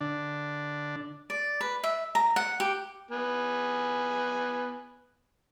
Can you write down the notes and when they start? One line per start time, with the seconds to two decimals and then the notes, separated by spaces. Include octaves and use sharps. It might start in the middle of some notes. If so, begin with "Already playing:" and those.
0.01 D3 D4
1.30 D5
1.61 B4
1.83 E5
2.15 A#5
2.36 F#5
2.60 G4
3.11 B3 G#5